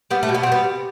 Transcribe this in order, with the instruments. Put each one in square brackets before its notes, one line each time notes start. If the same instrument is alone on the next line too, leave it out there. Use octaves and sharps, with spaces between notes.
[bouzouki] G3 B3
A3
B2
B3
C4
G3
B3
C3